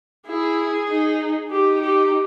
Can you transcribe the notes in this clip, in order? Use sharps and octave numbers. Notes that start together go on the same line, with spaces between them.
E4 G#4
D#4
D#4 G4
G4